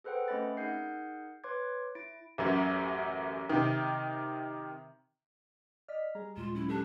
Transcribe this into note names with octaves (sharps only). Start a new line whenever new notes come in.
G#4 A4 B4 C5 F#5 G5
A3 C4 C#4 D#5 B5 A6
D#4 G#4 A#4 F#5 G6 C7
B4 C#5 C6 D6 G#6
E4 A6 D7
A1 F#2
C3 D#3
D5 D#5 F6 B6
G3 G#4 A#5
D#2 A#2 G#3 F4 E7
F#3 C#4 E4
D4 G4 A4